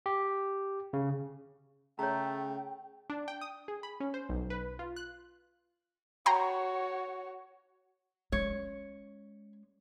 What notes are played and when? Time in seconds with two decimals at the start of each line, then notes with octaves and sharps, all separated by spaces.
0.06 G4
0.93 C#3
1.99 C#3 A3 C#5 G5 A#5
3.10 D4
3.28 G5
3.41 D#6
3.68 G#4
3.83 B5
4.00 C#4
4.14 C5
4.29 B1
4.50 B4
4.79 F4
4.96 F#6
6.26 F#4 C#5 G5 A#5 C6
8.32 G#3 C#4 C#5